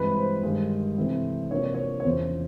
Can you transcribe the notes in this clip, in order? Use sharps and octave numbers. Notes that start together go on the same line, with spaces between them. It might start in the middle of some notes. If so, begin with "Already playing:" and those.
Already playing: G2 E3 G#3 C4 B4
C5
G2 D#3 G#3
C3 E3 A3 C4
C3 F3 A#3 D4 C#5
D5
C#5
C#5
E2 C#3 F3 C5